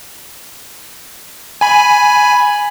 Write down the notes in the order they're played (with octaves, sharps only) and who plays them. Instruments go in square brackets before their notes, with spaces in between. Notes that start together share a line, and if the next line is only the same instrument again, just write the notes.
[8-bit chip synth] G#5 B5